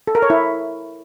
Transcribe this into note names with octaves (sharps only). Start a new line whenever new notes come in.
A4
A#4
C#5
E4